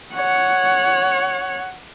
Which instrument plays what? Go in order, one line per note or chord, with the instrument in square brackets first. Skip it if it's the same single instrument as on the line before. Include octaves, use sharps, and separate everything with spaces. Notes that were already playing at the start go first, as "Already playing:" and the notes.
[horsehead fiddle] C#5 F#5